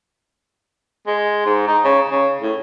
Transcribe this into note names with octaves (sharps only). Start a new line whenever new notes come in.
G#3
G#2
D#4
C#3
C#3
A2